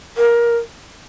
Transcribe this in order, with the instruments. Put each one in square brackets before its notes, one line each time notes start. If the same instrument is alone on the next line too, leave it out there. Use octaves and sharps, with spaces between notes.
[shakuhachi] A#4